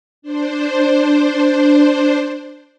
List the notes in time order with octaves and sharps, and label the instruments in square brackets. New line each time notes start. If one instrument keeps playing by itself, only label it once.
[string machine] D4 C5